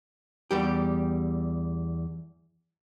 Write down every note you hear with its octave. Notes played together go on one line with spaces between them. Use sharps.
E2 G3 G4